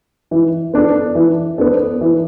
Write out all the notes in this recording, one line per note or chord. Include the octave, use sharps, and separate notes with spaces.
E3
B3 D4 A4
E3
B3 D4 A4
E3